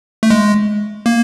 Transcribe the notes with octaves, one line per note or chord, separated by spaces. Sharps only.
A3
G#3
A#3